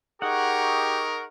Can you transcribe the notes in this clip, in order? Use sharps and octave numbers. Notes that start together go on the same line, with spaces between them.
D#4 G4 G#4 A#4 F#5 C#6